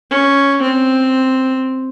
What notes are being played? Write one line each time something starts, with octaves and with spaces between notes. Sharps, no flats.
C#4
C4